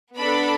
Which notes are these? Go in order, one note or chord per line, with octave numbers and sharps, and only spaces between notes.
B3 D4 A4 B5